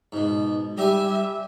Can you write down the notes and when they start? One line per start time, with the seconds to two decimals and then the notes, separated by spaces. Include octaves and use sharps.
0.12 G#2 B2
0.78 G3 G4 E5 G#5